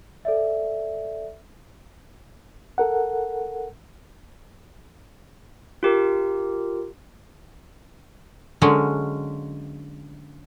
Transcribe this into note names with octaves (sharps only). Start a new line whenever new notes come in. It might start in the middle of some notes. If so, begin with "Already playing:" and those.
A4 D5 E5
A4 A#4 F#5
F4 G4 A#4
D3 F#3 G#3 A#3 C#4